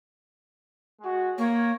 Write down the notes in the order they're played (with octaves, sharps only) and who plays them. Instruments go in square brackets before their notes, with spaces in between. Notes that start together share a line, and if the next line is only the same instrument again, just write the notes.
[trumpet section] G#3 F#4
[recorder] A#3 [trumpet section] C#5